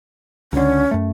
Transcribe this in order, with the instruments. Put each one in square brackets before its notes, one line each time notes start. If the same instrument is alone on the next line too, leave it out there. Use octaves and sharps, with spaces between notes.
[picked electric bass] C#2 D3 [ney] C#4
[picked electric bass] F#2 A3